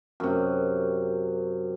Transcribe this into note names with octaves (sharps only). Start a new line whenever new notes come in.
F#2 C3